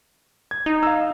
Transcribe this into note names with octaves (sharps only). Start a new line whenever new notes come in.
G#6
D#4
F5 E6